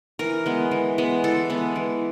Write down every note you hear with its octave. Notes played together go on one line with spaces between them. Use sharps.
E3 A#4
G#3 B3
E3
G#3 B3
E3 A4
G#3 B3
E3